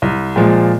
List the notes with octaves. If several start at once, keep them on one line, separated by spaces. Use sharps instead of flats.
C2
A#2 F3 G#3